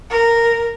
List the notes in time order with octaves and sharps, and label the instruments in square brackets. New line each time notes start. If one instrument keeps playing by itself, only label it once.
[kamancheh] A#4